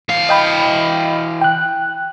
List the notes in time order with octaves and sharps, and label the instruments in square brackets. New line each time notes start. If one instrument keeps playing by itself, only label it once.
[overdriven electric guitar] E3 F5
[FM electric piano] D#5 G5 B5
G5 F#6